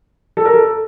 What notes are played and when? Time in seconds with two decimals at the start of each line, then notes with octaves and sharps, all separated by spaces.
0.37 A4
0.45 A#4
0.54 A4